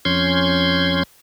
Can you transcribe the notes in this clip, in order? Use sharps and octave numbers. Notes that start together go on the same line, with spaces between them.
F2 C#4 C6 G6 G#6